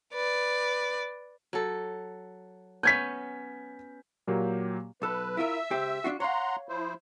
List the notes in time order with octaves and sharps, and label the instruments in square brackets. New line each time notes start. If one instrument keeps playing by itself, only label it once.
[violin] B4 D5
[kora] F#3 A4
[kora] B3 C#4 [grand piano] G6 G#6 B6
[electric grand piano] A#2 F#3 A#3 G4
[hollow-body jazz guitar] B1 A4 [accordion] B4
[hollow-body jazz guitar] E4 F4 A#4 [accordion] E5 E6
[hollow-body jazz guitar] C#2 G4 C5
D4 F4 F#4
[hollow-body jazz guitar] C#5 F5 [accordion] F#5 A#5 C6
[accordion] F3 E4 C5